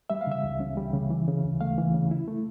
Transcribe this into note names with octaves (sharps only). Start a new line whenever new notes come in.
G3 E5
F5
C#3 E5
C#2
C#4
G3
C#3
E3
C#3
D2
A3 F5
E3
C#3
E4
A3